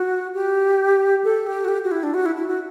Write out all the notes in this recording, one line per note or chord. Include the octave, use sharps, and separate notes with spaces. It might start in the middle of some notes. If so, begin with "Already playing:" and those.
Already playing: F#4
G4
A4
G4
F#4
G4
F#4
E4
D4
F#4
E4
E4
F#4